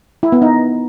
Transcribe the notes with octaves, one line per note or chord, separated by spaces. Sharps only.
E4
B3
D#4